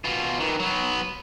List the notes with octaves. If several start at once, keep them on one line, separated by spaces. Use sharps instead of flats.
B2 F4
D#3 E3
F#3 B3